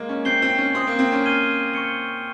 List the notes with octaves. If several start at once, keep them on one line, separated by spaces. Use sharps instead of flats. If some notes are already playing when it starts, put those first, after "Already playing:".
Already playing: G#3 A#3
C#4
C4 G6 C7 G7
C4
C#4
C4 C6 D#6 G6
A#3
C4
C#4
F6 G#6 C7 D#7 G7
C#6 G6 C#7 G7